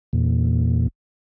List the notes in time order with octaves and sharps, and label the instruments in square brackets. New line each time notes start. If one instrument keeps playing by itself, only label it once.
[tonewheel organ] E2 A#2